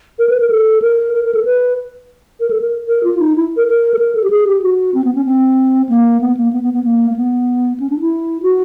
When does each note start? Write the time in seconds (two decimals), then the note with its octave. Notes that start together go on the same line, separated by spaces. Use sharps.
0.19 A#4
0.29 B4
0.40 A#4
0.50 A4
0.82 A#4
1.13 A#4
1.24 A#4
1.34 A4
1.45 B4
2.40 A#4
2.50 A4
2.61 A#4
2.88 A#4
3.04 F4
3.19 D#4
3.36 E4
3.56 A#4
3.68 A#4
3.94 A4
3.99 A#4
4.15 A4
4.24 G4
4.30 G#4
4.47 G4
4.62 F#4
4.94 C4
5.04 B3
5.15 C#4
5.25 C4
5.89 A#3
6.21 B3
6.37 A#3
6.53 B3
6.63 B3
6.73 B3
6.84 A#3
7.10 A#3
7.16 B3
7.80 C#4
7.90 D4
8.00 E4
8.42 F#4